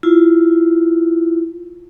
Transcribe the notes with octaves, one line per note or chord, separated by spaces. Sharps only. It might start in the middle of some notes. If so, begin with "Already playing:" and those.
E4 F4